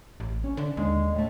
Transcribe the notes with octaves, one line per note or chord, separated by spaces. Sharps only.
A1
C#4
D3 E5
D#2 D3 G#3
A2 A3